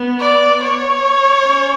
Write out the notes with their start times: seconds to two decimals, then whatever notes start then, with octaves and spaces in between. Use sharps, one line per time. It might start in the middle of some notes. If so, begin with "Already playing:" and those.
Already playing: B3
0.20 D5
0.63 C#5
1.46 C#4